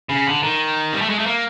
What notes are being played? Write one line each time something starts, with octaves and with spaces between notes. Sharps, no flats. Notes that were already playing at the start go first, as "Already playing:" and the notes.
C#3
D3
D#3
G3
A3
G#3
A3
A#3